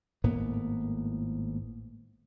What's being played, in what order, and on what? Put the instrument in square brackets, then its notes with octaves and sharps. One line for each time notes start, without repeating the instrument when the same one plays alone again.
[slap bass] G#1 A2 A#3 B3